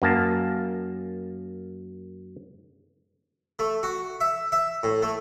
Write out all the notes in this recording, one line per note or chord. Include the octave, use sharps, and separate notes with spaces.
F#2 A#3 A5
A3
F#4
E5
E5
A2
A3